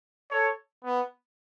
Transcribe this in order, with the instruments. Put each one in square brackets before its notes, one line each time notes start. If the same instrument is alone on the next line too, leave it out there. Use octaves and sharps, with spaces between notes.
[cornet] A4 [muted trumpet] C#5
[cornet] B3